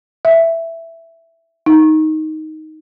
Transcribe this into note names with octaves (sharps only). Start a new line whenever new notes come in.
E5
D#4